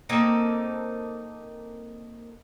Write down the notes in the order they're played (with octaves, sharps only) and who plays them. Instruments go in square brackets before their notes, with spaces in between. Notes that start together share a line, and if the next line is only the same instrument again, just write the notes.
[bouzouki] A#3 C4 D#4 A4